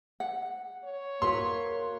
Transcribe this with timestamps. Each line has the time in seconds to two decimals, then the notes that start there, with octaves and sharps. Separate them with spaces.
0.20 F#5
0.85 C#5
1.22 A#3 F#4 B4 C6